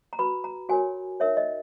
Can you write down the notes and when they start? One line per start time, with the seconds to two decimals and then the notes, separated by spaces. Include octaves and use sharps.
0.13 A#5
0.19 F#4 B4 B5
0.44 A#5
0.69 F#4 A#4 C#5 G#5
1.20 D#4 A#4 C#5 E5
1.37 D#5